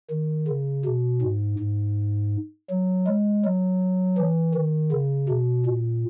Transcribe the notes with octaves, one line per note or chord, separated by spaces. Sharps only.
D#3
C#3
B2
G#2
G#2
F#3
G#3
F#3
E3
D#3
C#3
B2
A#2